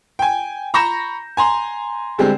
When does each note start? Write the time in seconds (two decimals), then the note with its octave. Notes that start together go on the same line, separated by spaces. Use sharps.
0.19 G5 G#5
0.74 A#5 B5 C#6 G6 A#6 E7
1.37 G#5 A#5 C6
2.18 D3 G3 G#3 C4